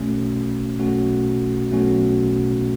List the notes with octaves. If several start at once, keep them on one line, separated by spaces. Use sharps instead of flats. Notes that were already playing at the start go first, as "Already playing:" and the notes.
Already playing: B1 B2 A3 C#4 F#4
B1 B2 A3 C#4 F#4
B1 B2 A3 C#4 F#4